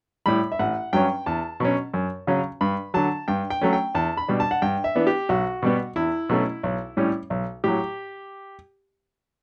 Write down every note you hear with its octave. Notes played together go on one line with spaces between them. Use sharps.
A2 G3 B5
E5
A1 F#5
G2 F#3 C#4 G5
E2 A5
B2 F#3 C#4
F#2
C#3 F#3 C#4
G2 B5
D3 F#3 A5
G2 G5
G5
F#3 A3 C#4
G5
E2 A5
B5
B2 G3 D4
A5
F#5
G2 G5
E5
E3 B3 D4
G4
B1 F#4
B2 G3 B3
E2 E4
B2 F#3 A3 C#4
B1
A2 G3 C#4
B1
A2 F#3 G4